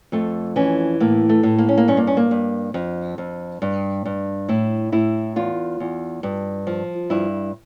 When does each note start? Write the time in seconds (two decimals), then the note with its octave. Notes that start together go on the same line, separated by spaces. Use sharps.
0.12 F2 A3
0.56 E3 C#4
1.00 A2 A#3
1.29 A3
1.43 A2
1.58 A#3
1.69 C#4
1.78 A#3
1.88 G2 C#4
1.97 A#3
2.07 C#4
2.17 A#3
2.31 G2
2.74 F2
3.18 F2
3.62 G2
4.05 G2
4.49 A2 E4
4.92 A2 E4
5.36 E2 F4
5.80 E2
6.23 G2
6.67 F3
7.10 G2 E4